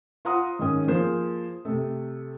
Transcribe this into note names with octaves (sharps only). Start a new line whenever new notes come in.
F4 C5 F#5 A#5 C6 D#6
G#2 D#3 C#4 D#6
F3 A#3 G#4 C5
C3 A3